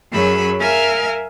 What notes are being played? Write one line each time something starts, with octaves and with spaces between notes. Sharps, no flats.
F#2 F#3 G#4 B5 E6
A#4 E5 F5 G#5 F6